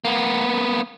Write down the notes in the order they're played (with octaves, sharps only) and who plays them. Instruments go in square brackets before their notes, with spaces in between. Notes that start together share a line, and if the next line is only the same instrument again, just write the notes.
[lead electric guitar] A#3 B3